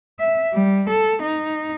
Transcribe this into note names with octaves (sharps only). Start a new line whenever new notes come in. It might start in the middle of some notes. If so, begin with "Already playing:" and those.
E5
G3
A4
D#4